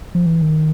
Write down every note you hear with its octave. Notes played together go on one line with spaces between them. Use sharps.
F3
E3
D#3